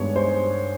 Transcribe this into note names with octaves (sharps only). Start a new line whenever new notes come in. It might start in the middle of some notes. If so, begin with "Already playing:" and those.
Already playing: G2 D#3 G#3 B3 C#5
C5